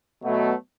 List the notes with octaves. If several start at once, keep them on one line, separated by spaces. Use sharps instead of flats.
B2 F#3 A3